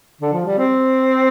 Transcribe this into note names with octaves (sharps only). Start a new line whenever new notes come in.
D3
F3
G3
C4